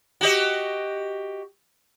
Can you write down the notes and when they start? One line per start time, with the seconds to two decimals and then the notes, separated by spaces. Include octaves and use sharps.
0.21 F#4 G4 D#5